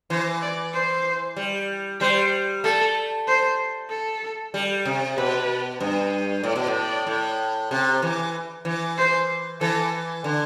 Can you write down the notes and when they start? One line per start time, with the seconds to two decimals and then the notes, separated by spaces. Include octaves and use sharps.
0.10 E3 C5
0.42 D5
0.74 C5
1.36 G3
2.00 G3 C5
2.64 A3 A4
3.27 C5
3.90 A4
4.54 G3
4.86 C3
5.17 B2 B4
5.80 G2
6.43 A2 D5
6.56 B2
6.67 A2
7.07 A2
7.71 C3
8.02 E3
8.65 E3
8.98 C5
9.61 E3 A4
10.24 D3